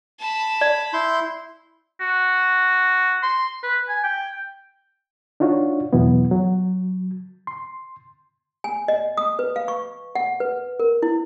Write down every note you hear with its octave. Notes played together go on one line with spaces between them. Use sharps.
A5 B5
D5
E4 C6 G6
F#4
C6
B4
G#5
G5
D4 D#4 F4 F#4 C#5
E2 B2 E3 F#3 B3
F#3
C6
G#5
D#5
D#6
B4
F5
C#6
F#5
B4
A#4
E4